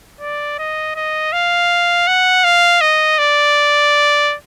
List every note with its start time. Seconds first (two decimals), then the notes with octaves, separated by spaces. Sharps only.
0.20 D5
0.59 D#5
0.95 D#5
1.32 F5
2.07 F#5
2.44 F5
2.81 D#5
3.18 D5